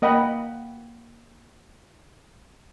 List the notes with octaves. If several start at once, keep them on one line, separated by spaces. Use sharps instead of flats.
A#3 D#5 F#5 G5 B5